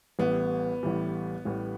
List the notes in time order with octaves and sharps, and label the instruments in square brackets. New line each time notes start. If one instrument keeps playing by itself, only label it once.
[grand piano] A1 A2 E3 G3 [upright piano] B3
[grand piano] A1 A2 E3 G3
A1 A2 E3 G3